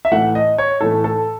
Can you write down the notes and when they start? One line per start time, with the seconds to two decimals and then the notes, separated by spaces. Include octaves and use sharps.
0.05 E5
0.12 A2 E3 A3 F#5
0.35 D#5
0.58 C#5
0.81 A2 E3 A3 A4
1.04 A4